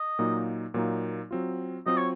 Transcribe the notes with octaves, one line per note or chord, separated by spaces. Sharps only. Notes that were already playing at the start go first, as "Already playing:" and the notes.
Already playing: D#5
A#2 F#3 A#3 D#4
A#2 F#3 A#3 D#4
F#3 C4 F4
F#3 C4 F4 D#5
C#5